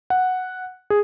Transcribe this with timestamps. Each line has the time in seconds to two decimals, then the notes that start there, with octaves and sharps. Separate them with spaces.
0.10 F#5
0.90 G#4